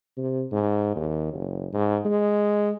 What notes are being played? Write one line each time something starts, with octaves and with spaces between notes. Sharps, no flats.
C3
G#2
D#2
F#1
G#2
G#3